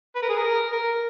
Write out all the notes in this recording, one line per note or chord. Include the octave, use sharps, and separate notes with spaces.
B4
A#4
G#4
A#4
A#4